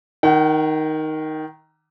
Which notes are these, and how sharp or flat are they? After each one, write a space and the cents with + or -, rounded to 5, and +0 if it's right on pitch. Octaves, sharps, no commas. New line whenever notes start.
D#3 +5 F#5 +40